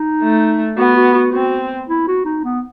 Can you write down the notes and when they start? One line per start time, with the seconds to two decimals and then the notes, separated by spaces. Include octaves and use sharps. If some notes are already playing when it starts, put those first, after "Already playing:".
Already playing: D#4
0.23 A3
0.77 B3 F#4
0.97 F#4
1.15 F#4
1.33 C4 F#4
1.89 E4
2.08 F#4
2.25 D#4
2.44 B3